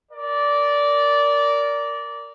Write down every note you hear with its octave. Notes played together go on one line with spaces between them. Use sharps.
A#4 D5